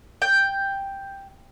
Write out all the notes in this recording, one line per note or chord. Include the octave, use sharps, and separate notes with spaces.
G5